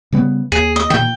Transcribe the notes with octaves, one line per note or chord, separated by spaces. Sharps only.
C#3 G3 B3
D#2 G#4
D#5
A#2 D#3 G5